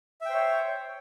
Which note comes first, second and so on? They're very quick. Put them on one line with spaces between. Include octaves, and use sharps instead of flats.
E5 G5 C5 C#5